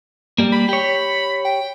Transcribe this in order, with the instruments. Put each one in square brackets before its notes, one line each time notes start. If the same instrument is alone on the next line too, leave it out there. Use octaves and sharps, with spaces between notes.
[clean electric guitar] G3 A#3
[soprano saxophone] B5
[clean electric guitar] G4 C#5
[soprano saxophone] G5